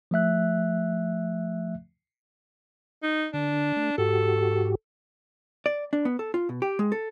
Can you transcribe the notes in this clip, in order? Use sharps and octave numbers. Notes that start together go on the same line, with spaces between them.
F3 A3 E5 F#6
D#4
D3 D4
A3
G#2 F#4 G4 A4
D5
D4
B3
A4
F4
B2
G4
G#3
A4